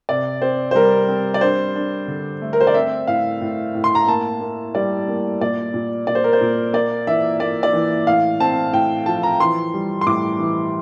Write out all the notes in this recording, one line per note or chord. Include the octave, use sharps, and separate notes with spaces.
C3 D5
C4 C5
C5
G3 A#4
C4
D5
D4 C5
D4
D3
A3
A#4
C5
D5
C4 E5
A2 F5
A2
A2
C6
A#5
A#3 A5
A#3
G3 D5
A#3
A#2 D5
A#2
A#2 D5
C5
A#4
C5
A#2
A#3 D5
E3 E5
A#3 D5
D5
E3
A2 F5
C4 A5
A2 G5
F3 A5
A#5
E3 C6
G3
C6
A2 D6
E3